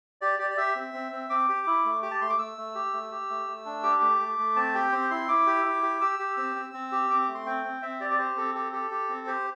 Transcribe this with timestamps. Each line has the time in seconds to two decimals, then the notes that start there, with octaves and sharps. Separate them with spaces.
0.21 G4 D5
0.39 G4 D5
0.50 D5
0.57 G4 E5
0.75 C4
0.94 C4
1.12 C4
1.30 C4 D6
1.49 G4
1.67 E4
1.85 A3
2.03 G4 D6
2.11 A5
2.21 A3 C6
2.30 D6
2.38 A3 E6
2.57 A3
2.75 G4
2.93 A3
3.11 G4
3.30 A3
3.47 A3
3.66 D4
3.83 G4 D6
4.02 A3
4.20 A3
4.38 A3
4.56 C4 A5
4.75 G4 G5
4.92 C4 C5
5.11 E4 C6
5.28 E4 D6
5.47 G4
5.65 E4
5.83 G4
6.01 G4 E6
6.19 G4
6.37 C4 E6
6.56 C4
6.73 C4
6.92 G4
7.10 C4 D6
7.22 D6
7.28 A3
7.35 C6
7.46 C4 G5
7.64 C4
7.82 C4 E5
8.00 G4 D5
8.11 D5
8.18 G4 C5
8.37 C4 A4
8.54 G4 A4
8.72 G4 A4
8.91 G4
9.09 C4
9.27 G4 C5